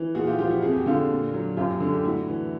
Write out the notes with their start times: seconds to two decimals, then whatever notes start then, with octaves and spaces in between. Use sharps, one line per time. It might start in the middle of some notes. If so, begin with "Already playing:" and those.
Already playing: E3
0.15 A#2 F#4 G#4
0.27 F4 G4
0.38 F3 F4 G4
0.50 E4 F#4
0.62 F2 G#4
0.71 G4
0.79 F#4
0.86 D3 F4 G4
1.10 A#2
1.34 F#3
1.57 F#2 F4 G4
1.80 D3
1.93 G4
2.04 A2 E4 F#4
2.28 E3